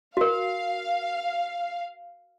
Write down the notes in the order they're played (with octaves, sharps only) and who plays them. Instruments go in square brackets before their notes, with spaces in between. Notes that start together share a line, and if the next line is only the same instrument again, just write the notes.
[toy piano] F#4 A#4 [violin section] F5